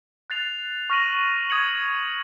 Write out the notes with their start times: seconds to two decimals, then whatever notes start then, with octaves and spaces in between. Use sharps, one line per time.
0.30 F#6 A6 C7 F7
0.90 C#6 F6 A#6 D#7 F#7
1.50 D#6 G#6 C#7 F#7